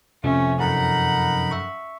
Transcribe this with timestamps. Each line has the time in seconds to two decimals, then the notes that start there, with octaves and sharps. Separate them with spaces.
0.24 F2 C3 F3 A3 C#4 E5
0.60 F#2 C#3 D#4 A4 A#4 F#5 B5
1.51 E5 C#6